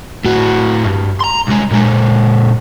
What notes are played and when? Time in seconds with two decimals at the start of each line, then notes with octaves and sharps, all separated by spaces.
0.25 A2 F#4
0.85 G2
1.20 A#5 C6
1.47 C2 G#3
1.71 A#2 G#3